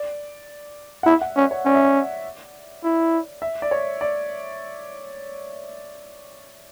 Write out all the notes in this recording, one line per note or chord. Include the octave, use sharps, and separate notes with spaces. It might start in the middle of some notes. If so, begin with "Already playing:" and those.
Already playing: D5
F#5
E4 E5
F#5
C#4 D5
C#5
C#4 D5
E5
D5
E4
E5
D5
C#5
D5